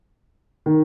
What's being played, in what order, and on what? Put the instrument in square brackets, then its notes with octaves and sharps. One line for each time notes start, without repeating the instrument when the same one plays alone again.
[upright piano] D#3